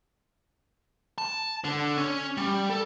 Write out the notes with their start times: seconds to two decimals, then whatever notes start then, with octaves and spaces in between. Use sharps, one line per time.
1.18 A5
1.65 D3
1.97 C#4
2.38 G3
2.70 A4